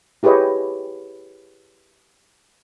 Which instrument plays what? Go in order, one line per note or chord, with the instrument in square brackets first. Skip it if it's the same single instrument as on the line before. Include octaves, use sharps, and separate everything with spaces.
[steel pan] E4 G4 G#4 B4 C#5 D#5